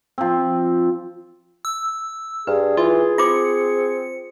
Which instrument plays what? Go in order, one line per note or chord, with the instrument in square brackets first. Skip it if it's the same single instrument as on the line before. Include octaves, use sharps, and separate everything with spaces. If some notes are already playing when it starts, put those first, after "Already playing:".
[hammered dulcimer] F3 C4
[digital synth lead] E6
[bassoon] G2 [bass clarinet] G#4 [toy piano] B4
[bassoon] E3 [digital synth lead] F4
[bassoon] C4 [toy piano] F4 C6 D6 [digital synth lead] C#7